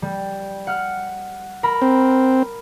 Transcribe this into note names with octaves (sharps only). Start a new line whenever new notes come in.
G3
F#5 F6
A#4 B5
C4